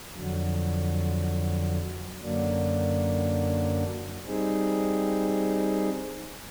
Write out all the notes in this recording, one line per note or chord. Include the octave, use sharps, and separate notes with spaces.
F2 D3 F#3
F#2 D3 F#3 A#3 D4
G3 C4 D#4 G#4